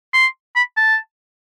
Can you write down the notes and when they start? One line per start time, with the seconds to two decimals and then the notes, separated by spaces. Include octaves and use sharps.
0.13 C6
0.56 B5
0.77 A5